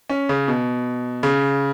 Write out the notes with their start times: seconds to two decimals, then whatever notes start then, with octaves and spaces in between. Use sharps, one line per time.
0.10 C#4
0.29 C#3
0.48 B2
1.23 C#3